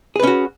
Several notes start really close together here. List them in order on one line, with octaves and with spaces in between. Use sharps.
G#4 B4 C#4 F#4